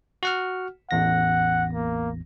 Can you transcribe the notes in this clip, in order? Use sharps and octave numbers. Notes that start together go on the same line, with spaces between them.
F#4 F#5 F6
A1 E2 F#5 A#6
A#3